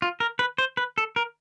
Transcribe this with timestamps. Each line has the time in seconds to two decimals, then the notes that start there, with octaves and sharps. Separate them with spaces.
0.02 F4
0.20 A#4
0.39 B4
0.58 C5
0.77 B4
0.98 A4
1.16 A#4